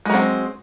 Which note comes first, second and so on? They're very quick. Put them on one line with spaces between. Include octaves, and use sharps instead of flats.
G#3 F#3 C4